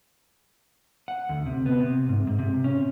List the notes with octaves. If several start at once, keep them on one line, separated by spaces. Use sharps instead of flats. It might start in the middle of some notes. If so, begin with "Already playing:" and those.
F#5
D2
C3
B3
C3
G#2
G#2
C3
C#4